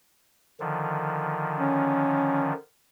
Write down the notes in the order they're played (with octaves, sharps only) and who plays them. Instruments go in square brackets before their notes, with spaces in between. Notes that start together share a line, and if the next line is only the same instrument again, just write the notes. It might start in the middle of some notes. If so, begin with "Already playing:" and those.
[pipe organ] D3 D#3 F3
[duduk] C#4